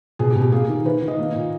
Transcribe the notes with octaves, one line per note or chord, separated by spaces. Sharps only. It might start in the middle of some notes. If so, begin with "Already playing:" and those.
B2 G#4
G4
B2
G4
A#3 G#4
D#3
D#3 B4
D#3
D#5
A#3
A#2